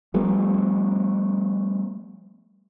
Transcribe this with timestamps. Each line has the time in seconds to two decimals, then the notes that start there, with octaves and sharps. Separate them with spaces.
0.14 F3 G3 A3 B3